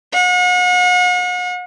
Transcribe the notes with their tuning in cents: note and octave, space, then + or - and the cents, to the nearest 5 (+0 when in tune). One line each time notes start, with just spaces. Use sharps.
F#5 -40